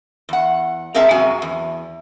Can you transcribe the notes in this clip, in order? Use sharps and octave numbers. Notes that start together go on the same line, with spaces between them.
E2 F#5
G#3 A#3 C4 E5 F5 A5
F#2 C3 F#4 G#5
E2